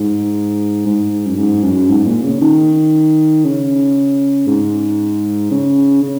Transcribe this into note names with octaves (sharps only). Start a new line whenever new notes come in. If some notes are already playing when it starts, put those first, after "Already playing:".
Already playing: G#2
G#2
F#2
G#2
F#2
G#2
A#2
C#3
D#3
C#3
G#2
C#3
C#3